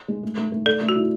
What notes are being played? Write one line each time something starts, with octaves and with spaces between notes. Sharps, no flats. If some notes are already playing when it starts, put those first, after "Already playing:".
G#3
A3
A3
A3
A4 D5
A3
F#4
E4